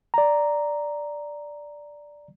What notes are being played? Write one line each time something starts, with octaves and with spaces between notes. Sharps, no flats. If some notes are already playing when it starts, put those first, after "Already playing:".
D5 A#5